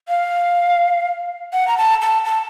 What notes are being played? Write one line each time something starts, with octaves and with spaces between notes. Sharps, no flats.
F5
F#5
A#5
A5
A5
A5